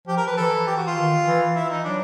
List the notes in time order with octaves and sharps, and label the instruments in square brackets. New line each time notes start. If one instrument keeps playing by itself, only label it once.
[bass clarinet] F3 [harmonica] G4
[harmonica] A#4
B4
[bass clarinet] E3 [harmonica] A4
[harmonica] G4
F#4
F4
[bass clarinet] D#3
E3
[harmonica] E4
D#4
[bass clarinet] F#3 [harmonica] D4